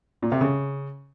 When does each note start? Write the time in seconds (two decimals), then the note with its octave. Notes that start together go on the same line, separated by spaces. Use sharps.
0.22 A#2
0.32 C3
0.41 C#3